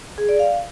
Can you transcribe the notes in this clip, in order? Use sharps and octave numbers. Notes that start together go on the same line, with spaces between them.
G#4
D5
F5